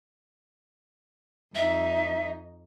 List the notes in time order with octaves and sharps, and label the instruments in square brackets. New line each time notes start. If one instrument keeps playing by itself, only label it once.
[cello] F2 D#4 [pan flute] E5